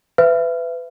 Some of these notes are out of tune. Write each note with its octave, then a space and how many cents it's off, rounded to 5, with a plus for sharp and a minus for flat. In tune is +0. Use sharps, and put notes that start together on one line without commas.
B4 +25 E5 +25